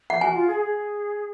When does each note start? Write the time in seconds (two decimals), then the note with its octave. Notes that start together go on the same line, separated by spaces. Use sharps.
0.10 F#5
0.21 F#4 G#5
0.34 F4
0.47 G#4
0.60 G#4